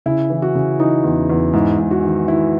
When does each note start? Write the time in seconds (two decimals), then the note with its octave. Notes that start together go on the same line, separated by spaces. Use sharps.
0.06 C#3 E4
0.30 E3
0.42 F#4
0.55 C#3
0.80 E3 D#4
1.04 E2
1.30 E2
1.53 G#2 E4
1.79 G#2
1.91 F#4
2.03 D#3
2.28 D#3 E4